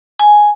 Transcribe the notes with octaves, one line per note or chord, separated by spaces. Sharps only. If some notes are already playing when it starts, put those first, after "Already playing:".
G#5